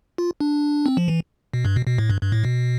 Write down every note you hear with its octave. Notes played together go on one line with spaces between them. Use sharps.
F4
D4
C4
F3
E3
B2
G2
B2
B2
A2
G2
G2
A2
B2